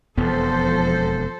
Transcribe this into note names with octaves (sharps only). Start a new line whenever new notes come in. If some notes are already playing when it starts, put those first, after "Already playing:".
E1 F2 F3 B3 A4 C5